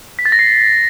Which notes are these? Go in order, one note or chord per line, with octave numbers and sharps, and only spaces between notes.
B6
A6
A#6
C7